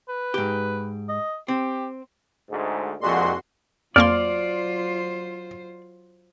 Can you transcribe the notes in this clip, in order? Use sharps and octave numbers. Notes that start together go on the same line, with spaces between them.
B4
G#2 G4
D#5
C4 G4
D2 G#2
C2 F2 A#2 G#3 F#4 C6
F2 F#3 A#3 F4 C5 D5 C6 F6